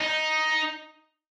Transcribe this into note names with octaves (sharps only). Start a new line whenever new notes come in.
D#4